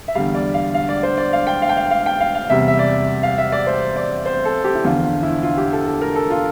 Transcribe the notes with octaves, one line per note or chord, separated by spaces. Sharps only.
E5
E2 D3 G3 F5
D5
F5
F5
D5
C5
D5
F5
G5
F5
G5
F5
F5
G5
F5
F5
E2 C3 G3 E5
E5
D5
F5
E5
D5
C5
D5
C5
A4
G4
E4
E2 D3 F3 F4
F4
E4
F4
G4
A4
A4
A#4
A4
F4